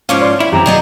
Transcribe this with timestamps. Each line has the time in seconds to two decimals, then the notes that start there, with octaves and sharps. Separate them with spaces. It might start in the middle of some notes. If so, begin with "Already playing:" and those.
0.09 G#2 F3 C#4 F5 C#6 D6
0.21 D5 C6
0.40 E2 E4
0.53 F#2 E3 C4 G4 A#5
0.66 B2 F#3 B3 G#4 D5 D#5